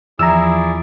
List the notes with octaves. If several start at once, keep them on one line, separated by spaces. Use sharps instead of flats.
E2 F3 E4 G#4 D5 A#5 E6